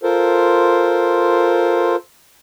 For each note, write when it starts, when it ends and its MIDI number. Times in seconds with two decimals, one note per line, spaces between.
0.03 1.96 65
0.03 1.96 69
0.03 1.96 70
0.03 1.96 72